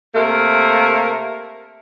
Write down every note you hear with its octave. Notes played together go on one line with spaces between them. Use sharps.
C3 A3 A#3 A#4